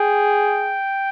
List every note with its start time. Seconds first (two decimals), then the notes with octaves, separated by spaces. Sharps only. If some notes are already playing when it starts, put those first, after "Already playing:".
Already playing: G#4 G5